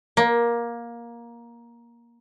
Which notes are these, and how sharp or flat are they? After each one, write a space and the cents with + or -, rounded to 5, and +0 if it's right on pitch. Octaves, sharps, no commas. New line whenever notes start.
A#3 +15